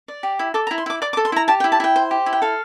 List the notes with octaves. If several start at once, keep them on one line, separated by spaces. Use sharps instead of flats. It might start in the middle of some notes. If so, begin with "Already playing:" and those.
D5
G4
E4
A4 D6
E4 A#5
C6
E4 D6
D5 D6
D6
A4
C6
E4 A#5
G4 A5
G5
E4
A5
E4 G5
C5
G4
E4
G5
A4 F5